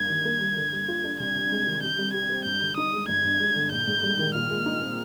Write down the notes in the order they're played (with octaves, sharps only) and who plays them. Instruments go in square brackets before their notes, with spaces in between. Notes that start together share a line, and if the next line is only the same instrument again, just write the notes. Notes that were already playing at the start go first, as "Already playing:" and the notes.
Already playing: [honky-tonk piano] G2 A#3 [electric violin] G#6
[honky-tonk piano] D#3
A#3
G3
D3
G3
F4
D4
[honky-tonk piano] C2 [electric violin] G#6
[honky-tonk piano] C3
G#3
D#3
[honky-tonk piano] C3 [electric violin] G6
[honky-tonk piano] G3
[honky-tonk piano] G4 [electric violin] G#6
[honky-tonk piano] C4
[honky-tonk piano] G2 [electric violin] G6
[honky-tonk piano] D3
[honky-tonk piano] D#4 [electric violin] D#6
[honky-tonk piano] G#3
[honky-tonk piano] G1 [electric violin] G#6
[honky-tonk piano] G2
G#3
D3
[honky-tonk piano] A#1 [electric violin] G6
[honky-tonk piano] G#2
G3
D#3
[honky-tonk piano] A#2 [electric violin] F6
[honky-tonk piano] G#3
D#4
C4